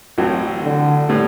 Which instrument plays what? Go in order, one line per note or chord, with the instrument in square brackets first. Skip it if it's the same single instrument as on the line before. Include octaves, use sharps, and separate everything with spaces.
[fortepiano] A1 A2 F#3 C4
[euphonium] D3
[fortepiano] A2 G3 B3